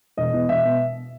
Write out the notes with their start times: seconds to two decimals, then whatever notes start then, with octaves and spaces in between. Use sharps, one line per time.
0.17 E1 D#5
0.33 E2 B2
0.49 E1 E5
0.65 B2